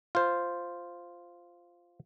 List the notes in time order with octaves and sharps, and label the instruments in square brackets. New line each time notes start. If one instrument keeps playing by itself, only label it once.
[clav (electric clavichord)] F4 C5